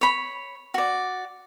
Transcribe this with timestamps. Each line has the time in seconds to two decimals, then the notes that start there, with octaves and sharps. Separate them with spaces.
0.01 C#5 B5
0.74 F#4 D5